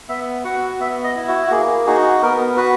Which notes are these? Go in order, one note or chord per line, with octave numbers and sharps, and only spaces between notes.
B3 E5
F#4 F#5
B3 E5
D#5
E4
F#4
F#4
A#3 G#4
D#4 F#4 G#4
B3 A#4
F#4 B4